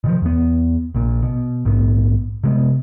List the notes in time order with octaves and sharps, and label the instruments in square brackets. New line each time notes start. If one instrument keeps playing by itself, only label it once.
[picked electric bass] B2 D#3 F3
E2 B3
A#1 A#2
B2
A#1 G#2 B3
C3 G#3 B3